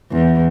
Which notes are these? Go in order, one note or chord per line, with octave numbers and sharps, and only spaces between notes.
E2